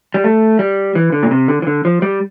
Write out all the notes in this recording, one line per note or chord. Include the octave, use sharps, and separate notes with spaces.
G3
A3
G3
E3
D3
A#2
C3
D3
E3
D3
F3
G3